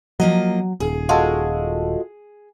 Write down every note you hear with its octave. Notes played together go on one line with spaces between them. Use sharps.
F3 F#3 A#3 D#5
D#1 G#4
G#3 F4 F#4 A4